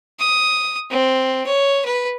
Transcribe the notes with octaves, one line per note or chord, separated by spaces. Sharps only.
D#6
C4
C#5
B4